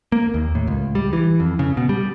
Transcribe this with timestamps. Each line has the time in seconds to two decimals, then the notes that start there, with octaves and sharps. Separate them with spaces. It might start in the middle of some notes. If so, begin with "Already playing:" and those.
0.12 A#3
0.34 D#2
0.55 A2
0.67 C#2
0.95 G3
1.13 E3
1.40 F2
1.59 C#3
1.77 B2
1.89 G3